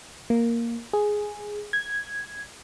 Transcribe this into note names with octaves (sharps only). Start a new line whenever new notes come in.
A#3
G#4
G#6